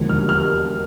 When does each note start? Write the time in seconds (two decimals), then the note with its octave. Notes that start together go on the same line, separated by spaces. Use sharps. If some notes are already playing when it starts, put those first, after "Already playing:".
Already playing: E1 D#2 D3 F3 G#3
0.09 F6
0.29 F6